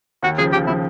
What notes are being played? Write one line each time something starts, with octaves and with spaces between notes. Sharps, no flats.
D#2 F#4
C#3 F3 G#4
D#2 G4
C#3 F3 E4